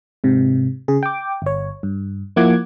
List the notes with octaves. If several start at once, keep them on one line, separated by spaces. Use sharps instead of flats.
G#2 C3
C#3 G#4
G5 D6
G1 C#5
G2
F3 A#3 E4 F#5 D6 G#6